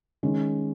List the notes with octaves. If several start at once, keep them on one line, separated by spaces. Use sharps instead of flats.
D#3 G#3 C#4